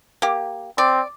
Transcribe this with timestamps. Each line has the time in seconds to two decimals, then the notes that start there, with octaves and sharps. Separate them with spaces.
0.22 A#3 G4
0.78 C4 D5